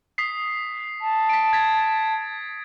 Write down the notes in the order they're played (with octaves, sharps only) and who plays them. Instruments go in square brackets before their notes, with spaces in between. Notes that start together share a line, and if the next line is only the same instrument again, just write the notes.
[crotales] D#6 B6 C7
[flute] A5
[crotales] B6 D7
G#6 A6 B6